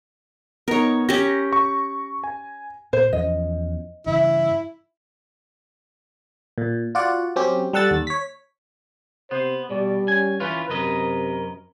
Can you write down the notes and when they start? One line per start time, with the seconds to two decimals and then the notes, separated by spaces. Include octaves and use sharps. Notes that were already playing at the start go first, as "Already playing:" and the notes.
0.68 B3 D#4 A#4 C#5
1.09 C#4 G4 A#6
1.53 C#6
2.24 G#5
2.93 A#2 C5
3.13 E2 F3 C#4 D#5
4.06 G2 C#3 E3 E4
6.58 A#2
6.95 F4 F#4 D5 F#5
7.36 F#3 C4 C#4 G4
7.73 G3 A4 F#5 E6 A6
7.91 D#2
8.07 C#5 B6
9.31 C3 B3 C5
9.70 B2 G3 D5
10.08 C#4 G#5
10.40 E3 C#4 F4 B4
10.70 F#2 C3 A#4 B4 D#5